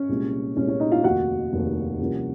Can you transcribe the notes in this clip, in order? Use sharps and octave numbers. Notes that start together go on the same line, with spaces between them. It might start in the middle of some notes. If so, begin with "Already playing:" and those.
Already playing: C#4 C#5
C2 A#2 G#3
C2 A#2 G#3 C#4 C#5
C#4 C#5
D#4 D#5
F4 F5
F1 D#2 D#3 F#4 F#5
F1 D#2 D#3
C2 C3 F3 A#3 C#4